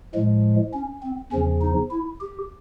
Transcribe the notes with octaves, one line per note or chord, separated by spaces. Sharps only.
A2 F3 G#3
C#4
C4
E2 C#3 F3 C#4
D#4
E4
G4